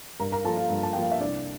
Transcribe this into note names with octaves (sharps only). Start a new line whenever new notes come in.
G2 A#4 A#5
A#4 A#5
F3 A#3 A4 A5
F4 F5
G2
A5
F3 A#3 G5
F5
E5
C2 D4 D5